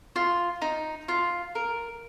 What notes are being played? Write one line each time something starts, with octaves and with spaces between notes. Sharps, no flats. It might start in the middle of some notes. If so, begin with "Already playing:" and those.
F4
D#4
F4
A#4